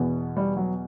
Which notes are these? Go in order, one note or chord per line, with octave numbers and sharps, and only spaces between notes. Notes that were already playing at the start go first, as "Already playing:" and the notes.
Already playing: E2 B2
G3
F#3